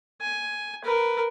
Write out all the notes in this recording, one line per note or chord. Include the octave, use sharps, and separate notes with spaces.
G#5
A#4 B4